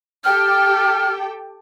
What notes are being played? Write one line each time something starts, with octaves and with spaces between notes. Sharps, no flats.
G4 A4 G5 F6